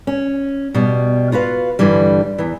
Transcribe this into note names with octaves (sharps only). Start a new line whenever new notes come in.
C#4
B2 G3
F4 F#4 B4 F5
G2 D3 E3 G3
E2 E3